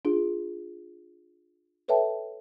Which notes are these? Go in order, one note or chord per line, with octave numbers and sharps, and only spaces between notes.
D4 F4 G#4
A4 B4 C#5 E5 G5 A5